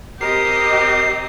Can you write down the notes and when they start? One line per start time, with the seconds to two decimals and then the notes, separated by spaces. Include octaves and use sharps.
0.21 C4 G4 A#4 D#5 C7